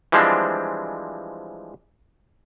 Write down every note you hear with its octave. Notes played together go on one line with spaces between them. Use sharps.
E3 F3 G3 G#3 C4 D4